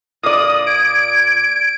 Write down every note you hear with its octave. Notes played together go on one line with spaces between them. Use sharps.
A#2 D5 D#6
G#6 D7